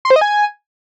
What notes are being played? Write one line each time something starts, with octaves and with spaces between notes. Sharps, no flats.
C6
C5
D#5
G#5